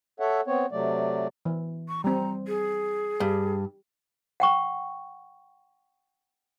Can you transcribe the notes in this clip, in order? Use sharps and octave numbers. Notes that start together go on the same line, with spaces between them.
A4 C#5 E5 F#5
B3 C4 C#5
C3 F#3 A3 D5
E3
C#6
G3 C4 A#5
G#4
G2
F#5 G5 C#6